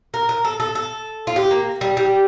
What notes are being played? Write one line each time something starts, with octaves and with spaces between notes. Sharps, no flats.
A#4
A#4
A4
A4
A4
F4
G4
A#3
G3
G3